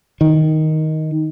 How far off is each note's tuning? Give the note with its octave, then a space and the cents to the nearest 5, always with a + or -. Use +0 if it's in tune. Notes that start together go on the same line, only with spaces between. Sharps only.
D#3 +5